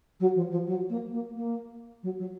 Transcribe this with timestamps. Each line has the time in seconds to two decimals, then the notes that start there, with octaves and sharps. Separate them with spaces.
0.19 F#3
0.35 F3
0.50 F3
0.66 F#3
0.89 A#3
1.11 A#3
1.34 A#3
2.03 F#3
2.19 F#3